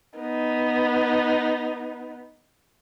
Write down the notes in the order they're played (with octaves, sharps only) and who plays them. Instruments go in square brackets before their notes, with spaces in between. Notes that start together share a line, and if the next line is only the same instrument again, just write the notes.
[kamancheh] B3 D#4